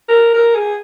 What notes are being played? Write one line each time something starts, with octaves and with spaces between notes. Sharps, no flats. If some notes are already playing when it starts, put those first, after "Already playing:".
A#4
A#4
G#4